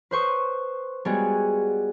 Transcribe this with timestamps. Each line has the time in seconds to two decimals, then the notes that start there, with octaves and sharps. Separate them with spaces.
0.11 B4 C5 C#6 D#6
1.05 G3 G#3 B3 F#4 G#4